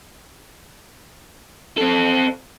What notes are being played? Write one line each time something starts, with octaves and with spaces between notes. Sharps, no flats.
C4 A4